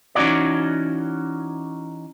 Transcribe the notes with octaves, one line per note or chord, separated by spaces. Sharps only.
E3 C#4 D#4 F#4 C#5 D5